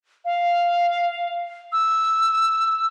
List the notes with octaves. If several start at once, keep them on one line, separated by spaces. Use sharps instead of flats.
F5
E6